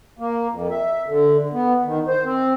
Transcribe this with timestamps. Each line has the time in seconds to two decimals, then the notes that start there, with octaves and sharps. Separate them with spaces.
0.19 A#3
0.50 F2
0.71 E5
1.06 D3
1.53 B3
1.85 D#3
2.08 C5
2.24 C4